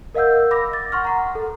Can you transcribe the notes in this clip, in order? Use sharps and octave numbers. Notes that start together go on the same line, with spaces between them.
A#4 D#5 F5 F#5 E6 G6
B5 D6 A#6
A6
F#5 C6 C#6 F6
F#5 A#5
A4